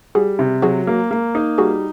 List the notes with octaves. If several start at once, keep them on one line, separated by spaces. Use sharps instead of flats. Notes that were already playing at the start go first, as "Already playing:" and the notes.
G3 F#4 G#4
C3
F#3 F#4 G#4
A#3
A#3
D#4
G3 F#4 G#4